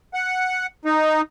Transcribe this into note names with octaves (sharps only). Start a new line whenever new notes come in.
F#5
D#4